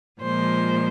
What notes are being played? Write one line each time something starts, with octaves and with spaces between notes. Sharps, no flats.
A#2 F3 G#3 C5